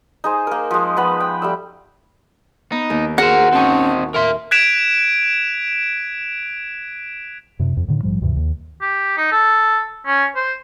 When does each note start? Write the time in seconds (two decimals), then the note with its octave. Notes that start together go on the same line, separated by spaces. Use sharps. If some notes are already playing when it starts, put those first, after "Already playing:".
0.24 D#4 G#4 C5
0.47 A#3 A#4
0.71 F3 G#3
0.97 F3 B3 B5
1.20 G5
1.42 G3 A3 E6
2.72 B3 D#4
2.90 D#2
3.18 F#4 G#4 A#4 C5 F#5
3.52 C4 C#4 D#4 G5 A5 C#6
4.14 A#4 E5 C6
4.51 F#6 G#6 B6 D7 E7 F7
7.59 F#2 C3
7.77 F2
7.88 A2 D3 D#3
8.03 A#1 G#2 F3 G3
8.21 D2 G2 C3 E3
8.37 D#2
8.82 G4
9.17 D#4
9.32 A4
10.07 C#4
10.36 C5